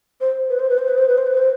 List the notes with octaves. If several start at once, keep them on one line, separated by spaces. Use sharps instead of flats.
C5
B4
C5
B4
C5
B4
C5
B4
C5
B4
C5